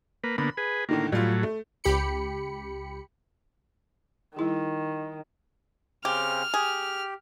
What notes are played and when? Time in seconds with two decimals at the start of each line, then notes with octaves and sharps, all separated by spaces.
0.24 A#3 B4
0.38 D3 A#3 B3 B5
0.57 G#4 B4
0.89 A2 D3 D#3 A#3
1.12 A2 F#3 G3 F4
1.43 A3
1.84 C#2 G4 B5 C#7
4.36 D#3 G3 E4 G#4
6.05 C#3 C4 C#4 G4 F6
6.54 G4 G#4